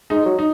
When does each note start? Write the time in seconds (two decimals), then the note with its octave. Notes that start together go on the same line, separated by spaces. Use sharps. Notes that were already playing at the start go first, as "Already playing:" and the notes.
0.10 G#3 D#4
0.25 F#3
0.39 D#4